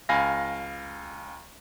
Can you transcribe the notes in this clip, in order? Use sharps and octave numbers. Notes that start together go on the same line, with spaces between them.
C#2 F5 G#5 B5 A#6